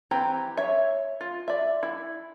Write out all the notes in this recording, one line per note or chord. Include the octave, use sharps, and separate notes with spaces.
E3 C4 G4 A#5
C#5 E5
F4
D5 E5
E4